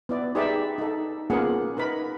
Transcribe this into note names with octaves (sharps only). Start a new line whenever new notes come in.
B3 E4 D5
D#4 G4 G#4 B4 D5 E5
D#4 A4
A#3 B3 C#4 F4 G#4 F#5
D#4 A#4 B4 B5